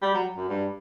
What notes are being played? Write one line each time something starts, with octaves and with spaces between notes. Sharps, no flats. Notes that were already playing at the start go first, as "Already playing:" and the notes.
G3
F#3
F#2
G2